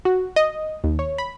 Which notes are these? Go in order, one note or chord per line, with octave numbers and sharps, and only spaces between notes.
F#4
D#5
D#2
C#5
B5